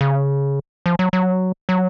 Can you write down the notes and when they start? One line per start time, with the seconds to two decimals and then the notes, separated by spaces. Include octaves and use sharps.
0.01 C#3
0.86 F3
0.99 F#3
1.13 F#3
1.69 F#3